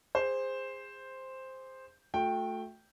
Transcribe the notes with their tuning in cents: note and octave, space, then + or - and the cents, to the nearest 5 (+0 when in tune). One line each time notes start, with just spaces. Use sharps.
G#4 -25 C5 +0
A3 +0 F#4 -45 G5 +0